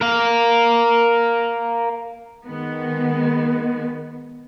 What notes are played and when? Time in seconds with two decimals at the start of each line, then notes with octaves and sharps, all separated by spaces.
0.01 A#4 F5
2.46 D#3 G#3 B3